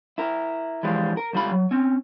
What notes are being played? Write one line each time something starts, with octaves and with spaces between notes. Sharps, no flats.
E4 A#4
E3 F3 G3 G#3 F4
A#4
C#2 G3 F4 B5
F#3
C4 C#4